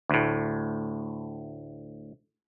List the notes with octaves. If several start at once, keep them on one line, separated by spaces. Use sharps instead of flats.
D2 A2